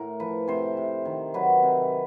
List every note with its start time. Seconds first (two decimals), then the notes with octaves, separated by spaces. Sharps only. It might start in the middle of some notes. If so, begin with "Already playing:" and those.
Already playing: A2 A#4
0.20 F3 B4
0.48 C3 C5
0.77 C3
1.05 D#3
1.34 F#3 B4
1.63 C3